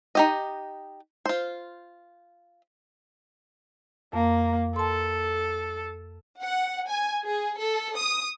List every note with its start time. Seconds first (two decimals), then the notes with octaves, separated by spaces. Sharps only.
0.15 D#4 G4 D#5
1.26 F4 C5
4.13 F2 A#3
4.76 A4 A5 C6
6.41 F#5
6.89 G#5
7.23 G#4
7.58 A4
7.96 D#6